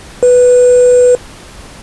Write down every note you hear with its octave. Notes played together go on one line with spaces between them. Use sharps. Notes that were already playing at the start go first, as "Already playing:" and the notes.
B4